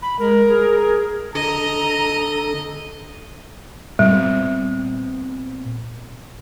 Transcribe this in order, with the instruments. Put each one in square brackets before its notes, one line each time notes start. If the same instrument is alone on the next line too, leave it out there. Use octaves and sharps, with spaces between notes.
[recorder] B5
[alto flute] G#3 [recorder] A#4
[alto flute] G#4
[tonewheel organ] D3 A4 [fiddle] D#5 [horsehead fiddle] A#5
[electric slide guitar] A#2 B3 C4 [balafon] G3